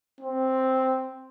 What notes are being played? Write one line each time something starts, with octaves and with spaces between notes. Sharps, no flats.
C4